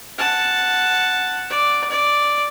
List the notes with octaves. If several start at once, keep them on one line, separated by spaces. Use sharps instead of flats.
F#5 A5
D5
D5